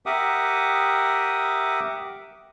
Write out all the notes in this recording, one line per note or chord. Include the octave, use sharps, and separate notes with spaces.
G4 A#4 E5 F#5 D6 D#6